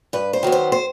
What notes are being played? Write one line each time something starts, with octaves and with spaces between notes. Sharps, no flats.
G2 B4
C5
D#3 F#3 B3
C5
C5